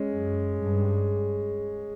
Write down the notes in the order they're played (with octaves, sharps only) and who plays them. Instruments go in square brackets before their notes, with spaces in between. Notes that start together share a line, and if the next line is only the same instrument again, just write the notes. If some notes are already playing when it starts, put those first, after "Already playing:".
Already playing: [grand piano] G#3 C#4
[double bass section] F#2
G2